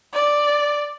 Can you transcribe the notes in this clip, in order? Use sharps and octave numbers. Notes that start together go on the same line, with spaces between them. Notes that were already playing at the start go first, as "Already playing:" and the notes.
D5